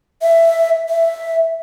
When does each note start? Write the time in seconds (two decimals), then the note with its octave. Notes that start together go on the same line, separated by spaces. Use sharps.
0.22 E5
0.89 E5